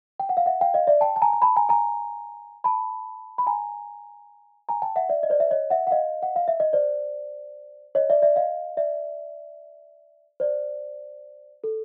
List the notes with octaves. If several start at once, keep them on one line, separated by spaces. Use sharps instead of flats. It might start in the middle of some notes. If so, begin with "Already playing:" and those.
G5
F#5
F5
E5 F#5
F5 G5
D#5 F5
D5 E5
G5 A5
A5
G#5 A#5
A#5
A5 B5
G#5 A#5
G#5 A#5
A5 B5
B5
G#5 A#5
G#5 A#5
G5 A5
E5 F#5
D5 E5
D#5
C5 D5
E5
C#5 D#5
E5 F#5
F#5
D#5 F5
F#5
F5
E5
D#5
C5 D5
C#5 D#5
D5 E5
D5 E5
D#5 F5
D5 E5
C5 D5
A4